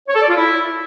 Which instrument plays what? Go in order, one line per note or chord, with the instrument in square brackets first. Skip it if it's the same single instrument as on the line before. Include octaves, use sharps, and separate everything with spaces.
[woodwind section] C#5
A4
D5
F4
E4